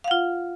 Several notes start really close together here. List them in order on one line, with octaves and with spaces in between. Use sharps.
F5 F#5 F4